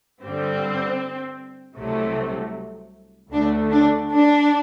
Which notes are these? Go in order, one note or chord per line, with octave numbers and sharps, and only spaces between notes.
G2 D3 G3 C4
C2 C3 F#3 A3
D2 D3 A3 D4
D4
D4